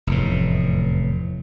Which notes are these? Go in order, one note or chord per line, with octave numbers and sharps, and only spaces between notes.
F1 E2 A2